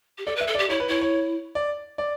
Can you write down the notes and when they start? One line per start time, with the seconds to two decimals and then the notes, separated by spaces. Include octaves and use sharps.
0.18 G4
0.26 A4 D5
0.36 B4
0.41 E5
0.48 A4
0.55 D5
0.59 G4
0.70 E4 C#5
0.80 B4
0.88 E4 C#5
1.01 C#5
1.55 D5
1.98 D5